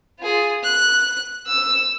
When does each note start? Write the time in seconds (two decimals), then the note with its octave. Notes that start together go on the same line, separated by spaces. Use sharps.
0.19 F4 G#4
0.64 F#6
1.47 E6